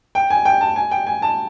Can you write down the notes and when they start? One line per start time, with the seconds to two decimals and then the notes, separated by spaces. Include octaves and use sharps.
0.15 G5
0.30 G#5
0.45 G5
0.61 A5
0.76 G#5
0.91 G5
1.07 G#5
1.22 A5